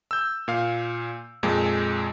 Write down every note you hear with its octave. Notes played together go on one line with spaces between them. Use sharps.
E6 G6
A#2 F5
F2 A#2 G#3